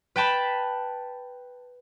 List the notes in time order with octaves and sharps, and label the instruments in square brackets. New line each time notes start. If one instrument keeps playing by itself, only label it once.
[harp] B4 G5 A5 B5